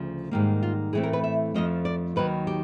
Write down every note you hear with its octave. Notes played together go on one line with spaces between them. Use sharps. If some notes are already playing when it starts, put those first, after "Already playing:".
Already playing: D2 C#3 F3
G#2 D#3 G3 A#3
F4
A2 E3 A3 C4 G#4
A#4
B4
E5
F2 D3 F3 A3 D#5
D5
D#2 D#3 F#3 B4
G4